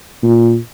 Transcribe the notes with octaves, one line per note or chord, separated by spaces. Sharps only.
A#2